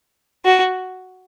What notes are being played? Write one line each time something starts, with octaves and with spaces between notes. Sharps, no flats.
F#4